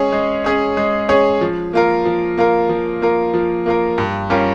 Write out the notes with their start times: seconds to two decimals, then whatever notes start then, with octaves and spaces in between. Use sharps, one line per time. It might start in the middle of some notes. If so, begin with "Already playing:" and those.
Already playing: G#3 C#4 G#4 C#5
0.12 G#3
0.44 C#4 G#4 C#5
0.77 G#3
1.09 C#4 G#4 C#5
1.41 F3
1.73 A#3 F4 A#4
2.05 F3
2.38 A#3 F4 A#4
2.69 F3
3.02 A#3 F4 A#4
3.34 F3
3.66 A#3 F4 A#4
3.98 G2
4.30 G3 C#4 F4 A#4